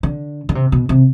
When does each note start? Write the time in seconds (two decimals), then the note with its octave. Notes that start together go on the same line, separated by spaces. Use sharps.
0.03 D3
0.49 D3
0.55 C3
0.72 B2
0.89 C3